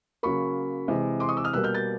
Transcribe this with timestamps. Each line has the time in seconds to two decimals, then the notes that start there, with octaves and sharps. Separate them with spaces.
0.23 C#3 F#3 A#3 B5 C#6
0.88 C3 E3 G#3
1.20 C6 D6
1.29 C#6 D#6
1.37 D6 E6
1.44 D#6 F6
1.53 B2 G3 A#3 E6 F#6
1.64 F6 G6
1.74 G6 A6